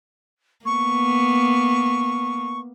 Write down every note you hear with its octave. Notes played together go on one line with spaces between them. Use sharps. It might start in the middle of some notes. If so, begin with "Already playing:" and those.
A#3 B3 C#6